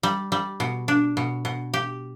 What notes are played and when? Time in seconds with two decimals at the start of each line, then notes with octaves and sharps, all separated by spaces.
0.03 G3
0.32 G3
0.60 B2
0.88 D4
1.17 B2
1.45 B2
1.74 G4